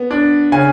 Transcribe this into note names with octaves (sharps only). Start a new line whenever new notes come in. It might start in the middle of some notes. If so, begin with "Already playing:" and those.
Already playing: B3
D4
C#3 G#5